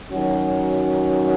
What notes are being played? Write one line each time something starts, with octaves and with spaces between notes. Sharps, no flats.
D#3 F#3 C#4 F#4